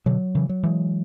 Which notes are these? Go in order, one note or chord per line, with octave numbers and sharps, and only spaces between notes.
B2 D3 F#3
C#3 E3
F#3
E3 G#3